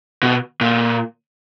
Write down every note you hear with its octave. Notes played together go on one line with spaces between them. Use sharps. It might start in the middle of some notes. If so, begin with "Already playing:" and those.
B2
A#2